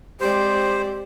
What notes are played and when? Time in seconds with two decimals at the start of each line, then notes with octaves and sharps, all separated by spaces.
0.20 G#3 C4 G4 C5 D5